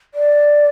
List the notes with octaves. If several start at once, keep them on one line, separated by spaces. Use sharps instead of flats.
D5